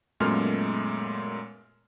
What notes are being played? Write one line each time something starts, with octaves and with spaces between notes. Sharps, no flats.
F#2 A#2 G#3 A3 B3 F6